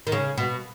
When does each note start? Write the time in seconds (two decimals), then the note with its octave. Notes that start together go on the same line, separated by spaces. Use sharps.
0.07 D#3
0.12 C#3
0.38 B2